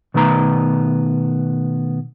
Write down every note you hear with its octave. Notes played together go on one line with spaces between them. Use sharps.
B2 D#3 A3 B3 A#5